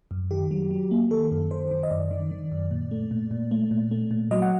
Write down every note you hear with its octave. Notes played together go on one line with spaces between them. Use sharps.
F#2
D#3 G4
F#3
F#3
A#3
D#3 A4
F#2
D#3 C5
D#3
D#5
F#2 D5
D#3
D#3
F#2
A#2
A3
A#2
A#2
A3
A#2
A3
A#2
F#3 D#5
F#5